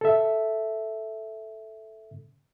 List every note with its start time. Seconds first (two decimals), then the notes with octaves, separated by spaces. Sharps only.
0.01 A4 E5